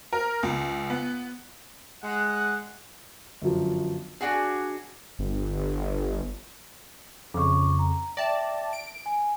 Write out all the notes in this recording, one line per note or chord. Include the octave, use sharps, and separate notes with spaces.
A#4
C#2
B3
G#3 F#5
G1 F#2 F3
D4 F#4 G#4 G#5
G1
F2 C#3 C#6 D6
A#5
D5 E5 G5 A5 A#6
D7
G#5